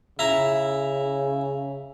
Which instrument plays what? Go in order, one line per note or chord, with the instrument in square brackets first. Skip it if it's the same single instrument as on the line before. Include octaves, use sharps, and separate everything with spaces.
[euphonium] C#3 [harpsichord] E4 A#5